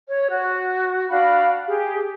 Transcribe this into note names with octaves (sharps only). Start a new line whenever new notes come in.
C#5
F#4
D4 F#4 F5 B5
G4 G#4